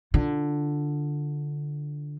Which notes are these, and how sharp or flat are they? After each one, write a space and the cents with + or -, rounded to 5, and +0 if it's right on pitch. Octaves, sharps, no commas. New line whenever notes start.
D3 +0 F4 +0